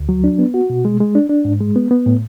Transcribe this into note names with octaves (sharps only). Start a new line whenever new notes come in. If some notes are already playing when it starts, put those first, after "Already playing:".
Already playing: D2
F#3
D4
B3
F#4
B2
G#3
G#3
D4
D4
G#2
G#3
B3
B3
A2